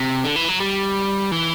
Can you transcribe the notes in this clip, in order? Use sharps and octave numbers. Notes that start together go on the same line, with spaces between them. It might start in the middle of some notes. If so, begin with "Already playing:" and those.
Already playing: C3
D3
E3
F#3
G3
E3